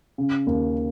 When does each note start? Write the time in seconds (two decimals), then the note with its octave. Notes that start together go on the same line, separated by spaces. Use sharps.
0.18 C#3
0.47 D#2